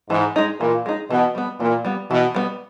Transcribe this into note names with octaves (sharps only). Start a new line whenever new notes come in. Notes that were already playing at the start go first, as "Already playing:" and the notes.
G#2 E3
G#3 D#4
A#2 E3
G#3 D#4
B2 E3
G3 B3
A#2 E3
G3 B3
B2 E3
G3 B3